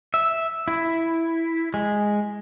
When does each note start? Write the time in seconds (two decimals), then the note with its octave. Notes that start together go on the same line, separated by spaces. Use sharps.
0.14 E5
0.68 E4
1.74 G#3